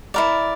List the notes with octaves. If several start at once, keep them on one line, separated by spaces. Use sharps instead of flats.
E4 A#4 D5